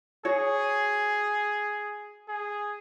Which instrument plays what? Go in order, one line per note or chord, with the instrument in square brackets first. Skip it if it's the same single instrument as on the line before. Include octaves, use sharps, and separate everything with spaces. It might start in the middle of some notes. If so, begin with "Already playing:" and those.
[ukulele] F#4 C#5 [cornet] G#4
[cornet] G#4